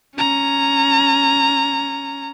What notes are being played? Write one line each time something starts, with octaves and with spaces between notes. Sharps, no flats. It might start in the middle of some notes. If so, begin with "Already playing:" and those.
C#4 A#5